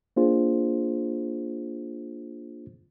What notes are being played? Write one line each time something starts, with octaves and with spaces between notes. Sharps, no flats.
A#3 D4 F4 G#4 C5